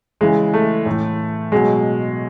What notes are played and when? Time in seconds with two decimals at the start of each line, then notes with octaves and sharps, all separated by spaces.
0.21 C#3 E3 G#3
0.54 A3
0.86 A2 E3
1.52 B2 F#3 G#3